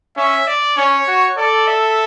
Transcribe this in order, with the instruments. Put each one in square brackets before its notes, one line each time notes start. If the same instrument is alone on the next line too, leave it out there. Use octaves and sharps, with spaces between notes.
[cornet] C#4 [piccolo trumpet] E5
[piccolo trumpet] D5
[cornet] C#4 [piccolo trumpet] C#5
[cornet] F#4
[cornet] A4 [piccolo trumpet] D5
[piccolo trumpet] E5